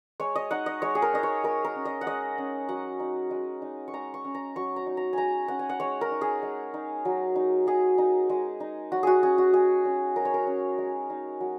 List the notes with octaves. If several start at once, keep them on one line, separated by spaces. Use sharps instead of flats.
G#3 C#5
D#5
D#4 F#5
D#5
G#3 C#5
G#4
A#4
D#4 D#5
C#5
G#3 A#4
A#4
C#4
D#5
F#5
G#3 D#5
C#4
F#3 F#5
D#4
G#3
D#4
C#6
G#3 A#5
C#6
C#4
A#5
F#3 C#6
A#5
D#4
A#5
G#3 G#5 A#5
C#4 F#5
G#5
F#5
G#3 C#5
A#4
D#4
G#4
G#3
D#4
F#3
D#4
F#3 G#4
D#4
G#3
D#4
F#3 F#4
F#4 G#4
C#4 G#4
F#4
G#3 G#4
C#4
F#3 A#4
C#5
A#4
C#4
G#3
D#4
F#3